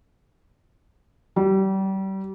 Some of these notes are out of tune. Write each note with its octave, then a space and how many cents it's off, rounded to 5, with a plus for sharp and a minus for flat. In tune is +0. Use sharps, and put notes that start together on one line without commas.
G3 -30